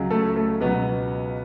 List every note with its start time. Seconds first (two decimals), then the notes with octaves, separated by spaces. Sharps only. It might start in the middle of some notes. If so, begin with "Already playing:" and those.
Already playing: C#2 C#3 F#3
0.11 A3 A4
0.36 A3 A4
0.60 C#2 B2 F#3 B3 B4